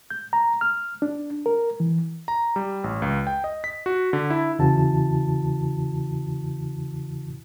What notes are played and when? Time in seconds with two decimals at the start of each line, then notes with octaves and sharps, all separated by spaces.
0.10 G6
0.33 A#5
0.61 F6
1.02 D4
1.46 A#4
1.80 E3
2.28 A#5
2.56 G3
2.84 A1
3.02 C#2
3.27 G5
3.44 D#5
3.64 B6
3.86 F#4
4.13 D3
4.30 E4
4.59 E2 C#3 E3 E4 F#4 A5